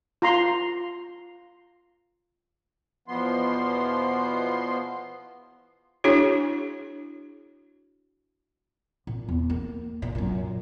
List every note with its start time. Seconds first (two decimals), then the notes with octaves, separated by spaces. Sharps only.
0.22 F4 A#5 C6
3.08 E2 B2 F3 B3 C6
6.04 D4 E4 F#4 G#4 C#5
9.07 A#2
9.28 E2
9.50 A#3
10.02 A#2
10.15 F#2 A#2